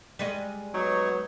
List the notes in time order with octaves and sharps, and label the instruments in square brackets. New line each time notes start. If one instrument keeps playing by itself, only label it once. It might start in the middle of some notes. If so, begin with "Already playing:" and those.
[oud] G3 G#3 D#5
[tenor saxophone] F#3 [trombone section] B3 [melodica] D#4 C#5